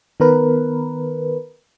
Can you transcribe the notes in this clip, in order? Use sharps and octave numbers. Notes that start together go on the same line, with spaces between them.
D#3 B3 A#4 B4